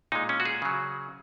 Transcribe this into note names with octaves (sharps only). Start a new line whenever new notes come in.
A#2 G#3 D#4
C#4
F#4
G#4
C#3 F#3